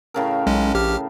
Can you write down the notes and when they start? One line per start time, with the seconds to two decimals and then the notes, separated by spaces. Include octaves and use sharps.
0.14 A2 C#3 A#4
0.47 B1 G#3 C#4
0.74 A#1 G4 F6